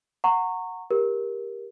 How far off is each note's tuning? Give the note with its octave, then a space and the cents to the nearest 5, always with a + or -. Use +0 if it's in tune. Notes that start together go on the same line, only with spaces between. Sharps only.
F#5 -5 A#5 -25 C#6 -15
G4 +15 A#4 +15